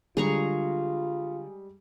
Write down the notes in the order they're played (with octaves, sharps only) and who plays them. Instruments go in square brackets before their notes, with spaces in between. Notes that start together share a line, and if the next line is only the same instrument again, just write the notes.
[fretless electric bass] D3 [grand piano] G3 G#3 [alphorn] F4 [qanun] G#4 A#5 C#6